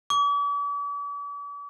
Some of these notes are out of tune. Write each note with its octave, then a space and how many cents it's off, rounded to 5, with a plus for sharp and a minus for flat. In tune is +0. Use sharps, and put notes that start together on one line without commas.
D6 -45